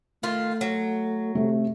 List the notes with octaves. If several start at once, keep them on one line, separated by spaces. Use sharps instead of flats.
D#3 A3 F4
F#3
C3 A3